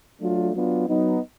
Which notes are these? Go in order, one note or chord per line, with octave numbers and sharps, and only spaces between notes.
F#3 A3 D4 F4
F#3 B3 D4 F4
F#3 B3 D#4